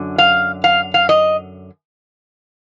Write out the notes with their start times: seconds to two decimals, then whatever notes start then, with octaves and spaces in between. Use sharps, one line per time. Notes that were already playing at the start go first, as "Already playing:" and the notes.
Already playing: F#2 D3
0.18 F5
0.64 F5
0.94 F5
1.09 D#5